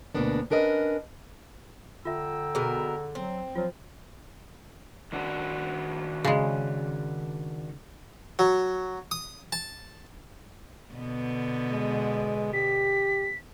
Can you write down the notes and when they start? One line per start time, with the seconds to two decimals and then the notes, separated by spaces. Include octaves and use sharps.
0.15 D2 B2 A#3 B3 D4
0.50 C#4 D4 A#4 B4 D#5
2.05 D3 F4 E5 G5 A#5 E6
2.55 B2 G#4 A#4
3.15 F#3 C4
3.55 F3 F#3 F4
5.12 D#3 D4 F#4
6.25 C#3 G#3
8.39 F#3
9.11 D#6
9.52 A5
10.93 B2 D3 B3
11.71 G#3
12.53 G4 B6